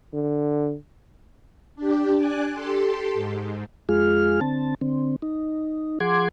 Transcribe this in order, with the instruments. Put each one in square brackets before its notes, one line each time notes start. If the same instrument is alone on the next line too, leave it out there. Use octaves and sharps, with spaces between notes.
[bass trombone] D3
[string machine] D4 G4
D4 D5 G#5 F#6
G4 A4 C6
G#2
[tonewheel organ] F2 G#3 F4 G#4 F6
D3 C4 A5
D3 C4
D#4
F3 G#4 F#5 C6 D6 G#6